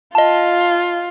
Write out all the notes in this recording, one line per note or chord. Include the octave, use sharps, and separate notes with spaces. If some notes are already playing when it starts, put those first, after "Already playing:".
F4 D#5 A5